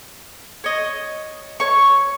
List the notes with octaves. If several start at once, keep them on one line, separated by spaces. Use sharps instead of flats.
C#5 D#5
C#5 C#6